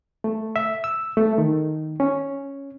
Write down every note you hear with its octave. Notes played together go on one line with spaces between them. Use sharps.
A3
E5
E6
A3
D#3
C#4